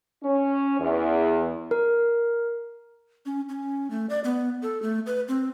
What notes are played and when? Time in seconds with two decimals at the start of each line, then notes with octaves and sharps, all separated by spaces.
0.23 C#4
0.80 E2
1.71 A#4
3.26 C#4
3.49 C#4
3.90 A3
4.10 D5
4.24 B3
4.63 A4
4.82 A3
5.06 B4
5.28 C4